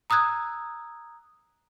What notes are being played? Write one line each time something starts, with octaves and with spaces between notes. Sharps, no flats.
A#5 D#6 E6 F#6 G#6